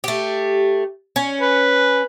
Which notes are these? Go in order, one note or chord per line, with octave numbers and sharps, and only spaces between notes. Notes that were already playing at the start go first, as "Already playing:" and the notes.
A3 G4
C#4
B4